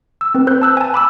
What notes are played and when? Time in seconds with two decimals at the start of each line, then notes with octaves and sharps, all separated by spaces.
0.21 E6
0.35 C4 B4
0.47 B4 C5 F#6 G6
0.62 A5 E6 F#6
0.77 G#5 A5
0.94 B5 D6 E6